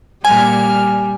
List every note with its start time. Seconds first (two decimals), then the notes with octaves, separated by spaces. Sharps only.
0.25 A#2 G3 G#5 F6